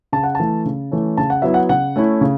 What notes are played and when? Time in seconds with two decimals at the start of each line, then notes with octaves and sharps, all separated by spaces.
0.12 C#3 A5
0.23 F#5
0.35 E3 A3 A5
0.65 C#3
0.91 E3 A3 C#4
1.17 C#3 A5
1.30 F#5
1.42 F#3 B3 E4 E5
1.54 F#5
1.69 C#3 F#5
1.96 A3 C#4 E4
2.21 C#3